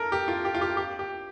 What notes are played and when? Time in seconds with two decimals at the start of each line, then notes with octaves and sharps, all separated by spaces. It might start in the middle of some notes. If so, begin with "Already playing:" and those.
Already playing: A4 A#4
0.12 G4
0.28 F4
0.45 G4
0.54 F4
0.61 G4
0.77 G4
0.99 G4